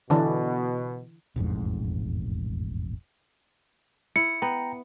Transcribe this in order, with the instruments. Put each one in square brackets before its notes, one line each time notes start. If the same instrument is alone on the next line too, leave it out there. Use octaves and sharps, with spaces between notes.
[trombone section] B2 [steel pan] D3 E3 D4
[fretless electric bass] E1 A1 F2 G#2
[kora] E4 [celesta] C#7
[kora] B3 [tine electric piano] G5 A#5